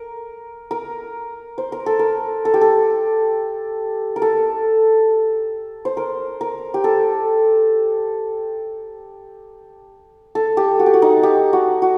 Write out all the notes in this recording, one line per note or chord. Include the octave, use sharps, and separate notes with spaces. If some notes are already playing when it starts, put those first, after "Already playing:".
Already playing: A#4
A#4
C5
A#4
A4
A#4
A4
G4
A4
A#4
A4
C5
A#4
A#4
G4
A4
A4
G4
F#4
G4
F#4
D#4
G4
F#4
F#4